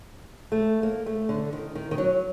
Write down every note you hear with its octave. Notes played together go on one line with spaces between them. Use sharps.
A3
A#3
A3
D3
D#3
D#3
D#3
F#3